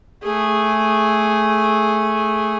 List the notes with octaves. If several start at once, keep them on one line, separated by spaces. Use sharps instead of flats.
A3 G#4